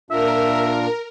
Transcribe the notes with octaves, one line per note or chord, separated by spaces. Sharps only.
A#2 D4 F4 A#4 E5